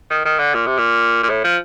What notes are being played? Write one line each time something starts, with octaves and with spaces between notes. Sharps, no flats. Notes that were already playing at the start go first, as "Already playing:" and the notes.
D#3
D#3
D3
A#2
C3
A#2
A#2
A2
F3